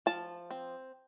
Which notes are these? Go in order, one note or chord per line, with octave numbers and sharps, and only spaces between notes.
F3 A5
C4